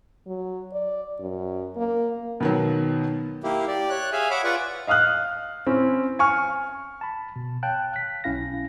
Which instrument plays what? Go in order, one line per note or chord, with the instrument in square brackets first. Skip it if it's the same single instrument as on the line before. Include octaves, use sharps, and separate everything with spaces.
[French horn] F#3
D5
F#2
A#3
[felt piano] B2 D#3 F#3
[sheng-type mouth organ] A#3 E4 G4
G4 D5
C#5 F#6
G#4 E5 F5 G#5
C#5 E5 F#5 B5 D6
F4 B4 D5 F#5 C#6
[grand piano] D#5 F5 D#6 F6 F#6
C4 C#4 E4
G#5 C#6 F6
[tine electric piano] A5 B5
B2
C#5 F5 G5 A5 F#6
F#6 B6
B1 C#4 E4 F5 A#6